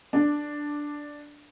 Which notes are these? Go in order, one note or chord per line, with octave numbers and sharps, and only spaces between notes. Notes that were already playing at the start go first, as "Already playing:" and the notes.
D4